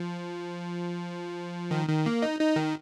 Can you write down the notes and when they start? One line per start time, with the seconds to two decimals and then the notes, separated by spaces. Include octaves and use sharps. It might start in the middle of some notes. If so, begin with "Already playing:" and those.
Already playing: F3
1.71 D#3
1.89 D#3
2.06 A#3
2.22 D#4
2.40 D#4
2.56 D#3